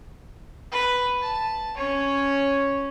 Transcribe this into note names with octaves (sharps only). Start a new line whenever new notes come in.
B4
A5
C#4 C#5